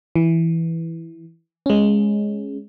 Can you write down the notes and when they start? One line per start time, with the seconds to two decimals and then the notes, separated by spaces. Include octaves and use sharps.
0.16 E3
1.66 G#3 C#4